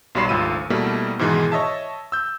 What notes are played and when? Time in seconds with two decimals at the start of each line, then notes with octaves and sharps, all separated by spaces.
0.15 B1 F#3 G3 B5 C7 E7
0.29 G#1 D2 F4 E6 D#7
0.70 B2 G3 A3 A#3 E4
1.19 G#2 B2 D#3 E3 G#3
1.52 C#5 D#5 E5 A5
2.12 E6 G6